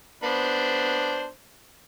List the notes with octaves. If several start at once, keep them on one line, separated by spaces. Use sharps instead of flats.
B3 D4 C5